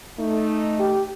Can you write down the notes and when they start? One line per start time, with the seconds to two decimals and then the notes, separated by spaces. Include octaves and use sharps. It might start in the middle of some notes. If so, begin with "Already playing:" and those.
0.19 A3 D#4
0.80 G4